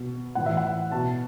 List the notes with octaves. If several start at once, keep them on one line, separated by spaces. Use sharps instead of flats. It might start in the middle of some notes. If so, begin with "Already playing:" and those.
Already playing: B2
A2 E3 F#5
E5
F#5
B2 A5